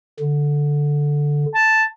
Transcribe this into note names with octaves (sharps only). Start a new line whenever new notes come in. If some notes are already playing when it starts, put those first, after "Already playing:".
D3
A5